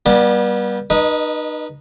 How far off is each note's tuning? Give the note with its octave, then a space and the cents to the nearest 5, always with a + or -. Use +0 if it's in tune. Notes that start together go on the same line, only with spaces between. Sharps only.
G3 -10 B3 -40 D5 +25
D#4 -35 B4 -30 D#5 +0